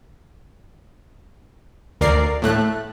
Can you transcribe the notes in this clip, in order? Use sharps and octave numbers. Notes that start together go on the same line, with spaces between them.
D2 A#4 D5 C7
A2 A3 F#6